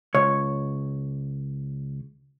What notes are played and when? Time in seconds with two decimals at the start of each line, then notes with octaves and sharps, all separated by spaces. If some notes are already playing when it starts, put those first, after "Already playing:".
0.15 C#2 C#5